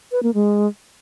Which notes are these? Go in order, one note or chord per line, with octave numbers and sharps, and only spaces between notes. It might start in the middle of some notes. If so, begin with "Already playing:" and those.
B4
A#3
G#3